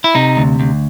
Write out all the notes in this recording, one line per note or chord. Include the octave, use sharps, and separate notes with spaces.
E4
C3 D#4
D2
D2